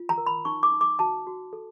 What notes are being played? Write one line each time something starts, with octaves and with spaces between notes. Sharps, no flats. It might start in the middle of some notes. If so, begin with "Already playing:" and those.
Already playing: F4
A#5
A#4
B5
D#4 C#6
D6
D#4
D6
F#4 A5
F#4
A4